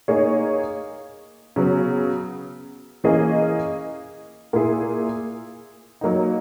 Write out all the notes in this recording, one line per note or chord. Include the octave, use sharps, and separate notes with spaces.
A#3 D#4 G#4 C#5
C#3 F#3 B3
E3 A#3 C#4 G#4 D#5
A#2 A#3 E4 G#4
F#3 A#3 D#4